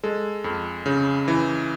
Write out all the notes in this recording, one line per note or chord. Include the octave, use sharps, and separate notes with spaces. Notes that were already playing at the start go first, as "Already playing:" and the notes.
G#3 A4
F2
C#3
E3